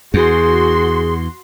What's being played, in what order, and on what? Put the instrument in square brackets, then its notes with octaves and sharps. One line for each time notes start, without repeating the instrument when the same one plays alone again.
[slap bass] E2 [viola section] F#4 C6 [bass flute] G#4